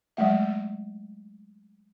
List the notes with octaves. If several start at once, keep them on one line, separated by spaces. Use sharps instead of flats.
F#3 G#3 A3 E5